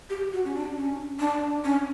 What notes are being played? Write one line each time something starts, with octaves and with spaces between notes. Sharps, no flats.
G4
F#4
C#4
D4
C#4
D4
C#4